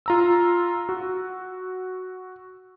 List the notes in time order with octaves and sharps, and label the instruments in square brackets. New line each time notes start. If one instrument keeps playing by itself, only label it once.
[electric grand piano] F4 A#5 E6
F#4